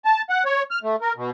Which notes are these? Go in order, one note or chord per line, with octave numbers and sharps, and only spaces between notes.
A5
F#5
C#5
F6
A3
A#4
B2